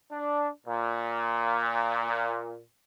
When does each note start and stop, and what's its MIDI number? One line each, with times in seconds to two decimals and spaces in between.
0.12 0.49 62
0.67 2.60 46